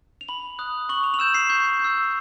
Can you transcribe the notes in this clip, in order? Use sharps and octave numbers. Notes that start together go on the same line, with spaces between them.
F7
B5 F#7
D#6 F#6
C#6 F#7
F7
F7
E6 G6 E7
C7
C#6 G6
G6
E6